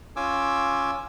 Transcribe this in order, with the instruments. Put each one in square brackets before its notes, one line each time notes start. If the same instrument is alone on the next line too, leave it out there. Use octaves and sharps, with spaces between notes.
[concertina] C#4 F4 G#5 D6 E6